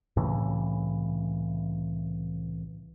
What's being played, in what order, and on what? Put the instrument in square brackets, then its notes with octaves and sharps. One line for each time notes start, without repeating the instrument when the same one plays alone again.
[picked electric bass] C2 A2 C#3 E3